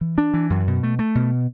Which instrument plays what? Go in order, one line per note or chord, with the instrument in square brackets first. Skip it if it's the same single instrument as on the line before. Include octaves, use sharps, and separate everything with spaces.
[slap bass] E3
D4
E3
F#2
B2
A3
A3
B2